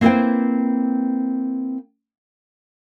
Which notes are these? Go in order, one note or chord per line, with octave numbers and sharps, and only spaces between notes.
A#3 C4 E4 B4 C5 G5